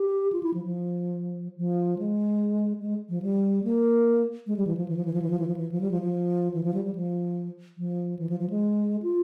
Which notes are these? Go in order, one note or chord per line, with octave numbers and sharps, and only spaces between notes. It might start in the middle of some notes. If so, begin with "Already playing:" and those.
Already playing: G4
F4
E4
F3
F3
F3
G#3
G#3
F3
G3
A#3
G#3
G3
E3
F3
E3
F3
E3
F3
E3
F3
E3
F3
E3
F3
G3
F3
F3
E3
F3
G3
G3
F3
F3
E3
F3
F3
G#3
F4